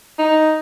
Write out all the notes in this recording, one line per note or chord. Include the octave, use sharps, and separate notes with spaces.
D#4